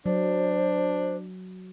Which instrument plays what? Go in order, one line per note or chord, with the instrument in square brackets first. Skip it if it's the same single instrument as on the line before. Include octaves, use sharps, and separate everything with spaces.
[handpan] F#3 [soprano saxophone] D4 [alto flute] C5